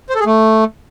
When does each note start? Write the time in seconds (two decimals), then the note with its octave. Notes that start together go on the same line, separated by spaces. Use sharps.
0.10 C5
0.15 A4
0.20 G#4
0.26 A3